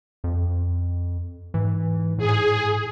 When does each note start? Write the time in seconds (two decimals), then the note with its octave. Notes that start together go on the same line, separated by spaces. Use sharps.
0.24 F2
1.54 G#2 E3
2.18 A2 G#4